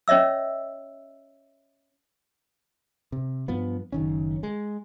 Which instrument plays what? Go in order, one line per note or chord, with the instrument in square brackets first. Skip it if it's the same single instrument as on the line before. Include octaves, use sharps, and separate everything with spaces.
[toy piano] C#4 C#5 D#5 E5 E6
[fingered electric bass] C3
G2 F3 B3
F#1 D#3 C#4
G#3